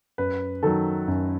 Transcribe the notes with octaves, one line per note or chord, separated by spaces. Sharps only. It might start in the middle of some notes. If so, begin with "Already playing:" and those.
F#2 B4
D#3 F#3 A4
F#2